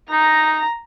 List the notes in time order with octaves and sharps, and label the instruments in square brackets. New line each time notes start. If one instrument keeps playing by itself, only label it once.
[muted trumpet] D#4 [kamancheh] A#5